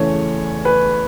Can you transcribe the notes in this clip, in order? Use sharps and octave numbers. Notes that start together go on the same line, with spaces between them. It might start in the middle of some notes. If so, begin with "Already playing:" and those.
Already playing: E2 C#3 E3 A3 C#5
B4